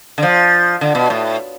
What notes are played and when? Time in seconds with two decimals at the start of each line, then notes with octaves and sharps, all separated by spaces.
0.18 D3
0.23 F3
0.81 D3
0.95 B2
1.10 A2